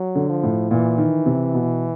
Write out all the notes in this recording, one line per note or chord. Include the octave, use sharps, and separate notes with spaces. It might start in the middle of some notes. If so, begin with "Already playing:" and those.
Already playing: F#3
D3
F3
A2
A#2 E3
D#3
C3
B2